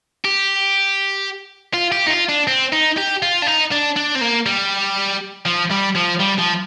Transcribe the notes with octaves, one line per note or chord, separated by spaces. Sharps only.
G4
F4
G4
D#4
F4
D4
C4
D#4
G4
F4
D4
D#4
D4
D4
C4
A#3
G3
F3
G3
F3
G3
F3